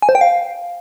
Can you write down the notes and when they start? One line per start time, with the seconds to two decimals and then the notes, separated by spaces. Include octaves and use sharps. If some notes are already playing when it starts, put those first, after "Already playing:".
0.02 G#5
0.09 C5
0.15 G5
0.21 F5